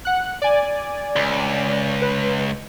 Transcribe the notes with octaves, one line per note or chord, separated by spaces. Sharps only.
F#5 F#6
D5 G#5
C#2
B4